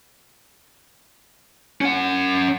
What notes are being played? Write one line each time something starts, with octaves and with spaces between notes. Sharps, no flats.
C#4 F#5